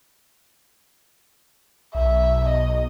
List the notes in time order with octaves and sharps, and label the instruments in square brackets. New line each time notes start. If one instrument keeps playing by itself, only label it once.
[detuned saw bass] B1 [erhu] E5
[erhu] D#5